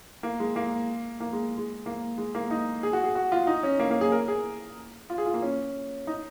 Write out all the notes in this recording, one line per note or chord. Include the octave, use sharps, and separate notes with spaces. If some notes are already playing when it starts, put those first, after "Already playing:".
A#3
G#3
A#3
A#3
G#3
G#3
A#3
G#3
A#3
D#4
G#4
F#4
G#4
F#4
F4
D#4
C#4
A#3
A#3
G#4
A#4
G#4
F4
G#4
F4
A#3
C#4
D#4